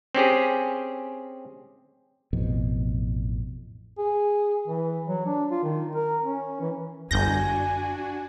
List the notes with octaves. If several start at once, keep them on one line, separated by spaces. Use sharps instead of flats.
C4 C#4 G4 G#4
A1 F2 B2
G#4
E3
F#3
D4
F4
D#3
A#4
C#4
E3
G1 F#2 D4 F#4 G#5 G6 A#6